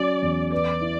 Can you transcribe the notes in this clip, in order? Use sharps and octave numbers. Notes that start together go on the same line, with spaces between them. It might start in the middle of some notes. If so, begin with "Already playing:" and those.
Already playing: F#3 C#4 D5
E2
B4 D5
E4